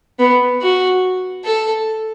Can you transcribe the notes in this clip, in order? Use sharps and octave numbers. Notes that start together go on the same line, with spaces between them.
B3
F#4
A4